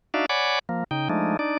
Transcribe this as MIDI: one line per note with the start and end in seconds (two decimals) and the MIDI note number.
0.14 0.26 62
0.14 0.26 63
0.14 0.26 66
0.14 0.26 74
0.14 0.26 76
0.14 0.26 77
0.29 0.59 73
0.29 0.59 74
0.29 0.59 78
0.29 0.59 80
0.29 0.59 83
0.29 0.59 86
0.69 0.84 53
0.69 0.84 58
0.91 1.08 49
0.91 1.08 63
0.91 1.08 79
1.09 1.37 53
1.09 1.37 56
1.09 1.37 57
1.09 1.37 62
1.09 1.37 63
1.39 1.57 62
1.39 1.57 63
1.39 1.57 74